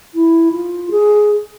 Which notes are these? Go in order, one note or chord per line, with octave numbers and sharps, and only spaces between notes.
E4
F4
G#4